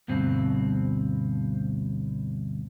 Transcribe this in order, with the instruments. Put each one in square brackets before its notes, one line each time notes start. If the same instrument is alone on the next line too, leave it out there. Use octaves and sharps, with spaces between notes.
[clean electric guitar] D2 G2 B2 C4